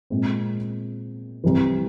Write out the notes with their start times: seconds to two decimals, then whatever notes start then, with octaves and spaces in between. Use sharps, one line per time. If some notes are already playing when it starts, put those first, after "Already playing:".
0.10 A#2 G#3 C4
1.44 C2 C3 E3